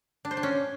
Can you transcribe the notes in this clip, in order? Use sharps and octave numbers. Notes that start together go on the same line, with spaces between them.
D4
C5
D4
C#4